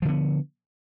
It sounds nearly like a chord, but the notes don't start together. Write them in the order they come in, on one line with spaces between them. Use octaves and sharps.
F3 D3 B3